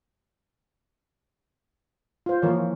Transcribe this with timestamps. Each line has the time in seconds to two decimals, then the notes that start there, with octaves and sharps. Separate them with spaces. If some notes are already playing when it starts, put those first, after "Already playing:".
2.26 F4 C5
2.42 E3 F3 A#3 A#4 C#5